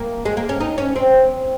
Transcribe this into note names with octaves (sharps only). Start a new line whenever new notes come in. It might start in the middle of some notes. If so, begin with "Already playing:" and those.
Already playing: A#3
G#3
A#3
C#4
D#4
C#4
C4